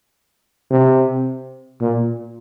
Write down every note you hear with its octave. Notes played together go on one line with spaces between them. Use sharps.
C3
A#2